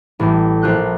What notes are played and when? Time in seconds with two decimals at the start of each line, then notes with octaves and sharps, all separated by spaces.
0.19 A1 A2 G3
0.62 A#1 F4 F#6 G6